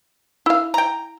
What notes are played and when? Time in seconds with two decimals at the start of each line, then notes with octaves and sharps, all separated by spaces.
0.46 E4 F5
0.74 G5 A#5